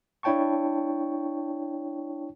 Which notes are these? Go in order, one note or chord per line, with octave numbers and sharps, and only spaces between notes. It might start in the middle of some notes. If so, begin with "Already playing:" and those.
D4 E4 C#5 G5 A5 C#6